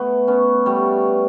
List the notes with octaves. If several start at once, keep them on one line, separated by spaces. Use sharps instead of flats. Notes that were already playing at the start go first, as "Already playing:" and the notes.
Already playing: A3 B3
B3 C#4
G3 A3